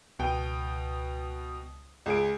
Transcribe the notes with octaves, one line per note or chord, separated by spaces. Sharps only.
C#2 B2 G5 D#6
C#2 G#4 D7